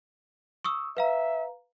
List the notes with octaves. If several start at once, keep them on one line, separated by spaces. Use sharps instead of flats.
C#6 D#6 E6
B4 E5 F5 A#5